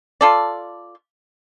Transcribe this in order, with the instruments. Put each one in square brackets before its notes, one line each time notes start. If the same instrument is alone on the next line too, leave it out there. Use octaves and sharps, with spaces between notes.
[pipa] F4 A4 D5